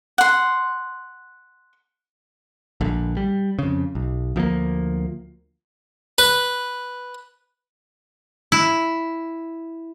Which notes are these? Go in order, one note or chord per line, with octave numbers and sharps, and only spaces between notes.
F#5 C6
A#1 D3
G3
F2 C#3
B1
D2 F3 A3 A#3
B4
E4